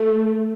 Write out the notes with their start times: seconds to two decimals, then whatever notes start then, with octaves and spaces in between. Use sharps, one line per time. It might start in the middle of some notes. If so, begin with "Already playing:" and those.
Already playing: A3